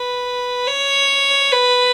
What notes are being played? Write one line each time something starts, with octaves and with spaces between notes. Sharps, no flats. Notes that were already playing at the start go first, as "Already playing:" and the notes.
Already playing: B4
C#5
B4